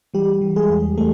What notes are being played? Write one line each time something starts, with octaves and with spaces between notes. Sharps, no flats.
E3 G3 G4
E3
G#3 G#4
E2
E3 A3 A4